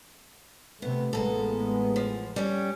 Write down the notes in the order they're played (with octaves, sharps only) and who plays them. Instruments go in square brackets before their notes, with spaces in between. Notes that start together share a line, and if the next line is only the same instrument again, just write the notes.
[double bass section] C3 A3 [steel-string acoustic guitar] B3
[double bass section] A1 G#3 B3 [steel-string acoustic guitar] A#3 A4
[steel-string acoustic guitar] F3
G3 C#4